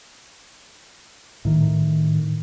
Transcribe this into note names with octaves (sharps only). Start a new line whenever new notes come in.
A2 D#3